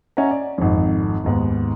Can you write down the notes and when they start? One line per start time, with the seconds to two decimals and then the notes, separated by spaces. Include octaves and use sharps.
0.17 C#4 C#5 D#5 E5 F#5 A#5
0.31 D5
0.58 G#1 F2
1.24 D#2 G#2 B3